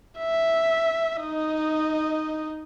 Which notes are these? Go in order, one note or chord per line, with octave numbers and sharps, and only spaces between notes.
E5
D#4 D#5